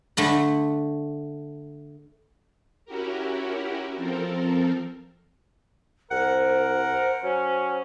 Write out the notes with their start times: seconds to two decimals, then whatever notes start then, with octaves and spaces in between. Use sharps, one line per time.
0.17 D3 A3 B5
2.85 C#4 E4 F#4 G4 A#4
3.96 F3 C4 A4 A#4
6.11 C2 A#4 C5 F#5
7.24 F#3 C#4